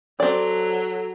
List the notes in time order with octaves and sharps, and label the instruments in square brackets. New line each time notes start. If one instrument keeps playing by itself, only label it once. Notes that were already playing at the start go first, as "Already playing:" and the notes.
[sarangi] F#3 [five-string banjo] C4 D5 [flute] A4